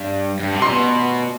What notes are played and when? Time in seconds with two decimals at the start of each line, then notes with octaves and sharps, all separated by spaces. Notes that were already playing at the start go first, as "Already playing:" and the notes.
Already playing: G2
0.39 G2
0.54 C3
0.62 C6
0.69 B2